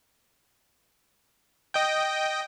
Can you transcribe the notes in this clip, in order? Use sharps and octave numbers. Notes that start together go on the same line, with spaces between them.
D#5 G5